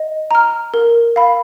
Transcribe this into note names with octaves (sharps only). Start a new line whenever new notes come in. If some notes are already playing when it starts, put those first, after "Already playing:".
Already playing: D#5
A#5 F6
A#4
F5 B5